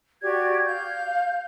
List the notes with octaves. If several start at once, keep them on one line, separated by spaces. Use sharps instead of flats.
F#4 G4 D5 G#6
F5 G6